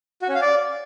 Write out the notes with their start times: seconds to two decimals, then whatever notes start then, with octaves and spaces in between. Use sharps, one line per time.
0.22 F#4
0.28 C#4
0.35 F5
0.41 D5